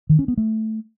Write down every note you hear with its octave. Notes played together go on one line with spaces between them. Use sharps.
D#3
C#4
B3
A3